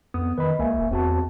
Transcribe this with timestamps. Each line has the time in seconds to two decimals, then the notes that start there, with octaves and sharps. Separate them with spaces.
0.14 F2 B3 D#6
0.38 D#3 B4 D#5 B5
0.59 C#2 A#3 E5 G#5
0.79 D#1
0.91 E2 C4 F#4 A5